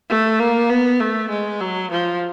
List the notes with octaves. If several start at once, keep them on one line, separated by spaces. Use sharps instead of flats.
A3
A#3
B3
A3
G#3
F#3
F3